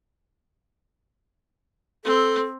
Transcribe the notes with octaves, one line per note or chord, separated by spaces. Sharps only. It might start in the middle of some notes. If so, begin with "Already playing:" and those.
C4 A4